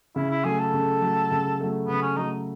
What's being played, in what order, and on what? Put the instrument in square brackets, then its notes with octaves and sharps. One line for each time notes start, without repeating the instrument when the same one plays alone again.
[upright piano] C#3 [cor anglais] E4
[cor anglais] E4
[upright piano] F#3 A3 [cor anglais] G#4
[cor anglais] A4
[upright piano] C#3
F#3 A3
C#3
F#3 A3
[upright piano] C#3 [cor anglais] B3
[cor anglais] C#4
[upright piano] F#3 A3 [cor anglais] D#4